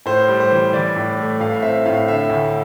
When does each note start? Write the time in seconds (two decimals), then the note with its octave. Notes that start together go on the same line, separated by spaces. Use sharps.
0.06 A2 C5
0.28 G3
0.40 C5
0.51 E3
0.73 E3 D5
0.96 A2
1.18 A3
1.40 A2 F5
1.62 C4 E5
1.86 A2 F5
2.08 D3 E5
2.30 D2